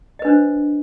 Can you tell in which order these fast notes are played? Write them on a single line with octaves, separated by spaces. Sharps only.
D#5 B4 D4 C5